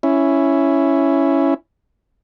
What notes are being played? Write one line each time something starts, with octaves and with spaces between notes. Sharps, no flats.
C#4 E4